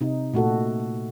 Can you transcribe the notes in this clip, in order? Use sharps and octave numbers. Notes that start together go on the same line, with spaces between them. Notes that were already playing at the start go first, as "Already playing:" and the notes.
C3 D#4
A#2 A3 F#4 A4